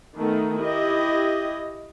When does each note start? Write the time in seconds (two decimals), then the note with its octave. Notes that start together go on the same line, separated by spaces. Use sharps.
0.17 D#3 A3 B3 D#4
0.58 E4 G4 D#5